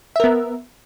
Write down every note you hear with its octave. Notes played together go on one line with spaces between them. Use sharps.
B3 A#4 E5